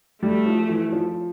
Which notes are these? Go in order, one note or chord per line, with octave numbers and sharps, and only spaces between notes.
G3 A3
F3
E3
F3